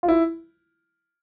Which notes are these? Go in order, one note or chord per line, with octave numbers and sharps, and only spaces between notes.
F4
E4